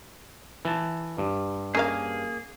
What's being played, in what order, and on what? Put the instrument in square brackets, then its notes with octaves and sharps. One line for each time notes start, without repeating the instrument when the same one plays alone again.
[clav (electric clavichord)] E3 A5
G2
[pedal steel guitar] A#3 G#4 [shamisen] C#4 A#4 F5